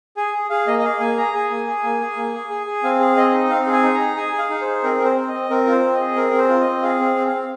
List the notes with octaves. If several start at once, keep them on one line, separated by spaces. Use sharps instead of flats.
G#4 G#5
G#4
G#4 F5
A#3 D#5
D#5
G#4 F5
A#3 G#5
G#4 A#5
G#4 G#5
A#3
G#4
A#3
G#4
A#3
G#4
G#4
G#4
C4 F5
G#4
C4 D#5
D#4
C4 F5
G#4
G#5
D#4
A#5
G#4
G#4 G#5
G#4
F5
D#4
C5
G#4
C4 A#4
C4
C5
C4
D#5
C4
C4 A#4
F4 C5
C4
G#4 D#5
C4 A#4
C4
C5
F4
D#5
C4
G#4 F5
C4 F5
C4
C4 F5